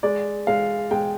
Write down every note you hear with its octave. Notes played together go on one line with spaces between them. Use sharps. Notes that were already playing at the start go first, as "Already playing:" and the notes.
G#3 D5
G#3 F5
G#3 G5